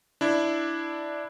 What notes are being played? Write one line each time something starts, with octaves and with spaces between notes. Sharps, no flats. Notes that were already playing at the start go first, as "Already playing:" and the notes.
D4 E4